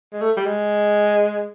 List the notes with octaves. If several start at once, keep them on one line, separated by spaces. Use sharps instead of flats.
G#3
A3
G3
G#3